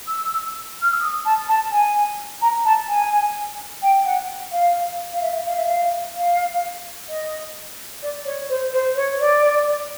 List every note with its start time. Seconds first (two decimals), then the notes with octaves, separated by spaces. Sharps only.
0.08 E6
0.82 F6
0.92 E6
1.01 D#6
1.25 A5
1.48 A5
1.72 G#5
2.41 A#5
2.65 A5
2.88 G#5
3.82 G5
4.05 F#5
4.52 F5
5.13 F5
5.22 E5
5.45 F5
5.56 E5
5.66 F5
6.15 F5
7.09 D#5
8.02 D5
8.25 C#5
8.49 C5
8.73 C5
8.95 C#5
9.19 D5